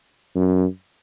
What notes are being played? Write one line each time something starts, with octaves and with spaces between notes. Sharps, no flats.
F#2